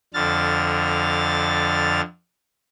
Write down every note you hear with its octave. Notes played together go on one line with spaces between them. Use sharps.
F2 D3 F6 A6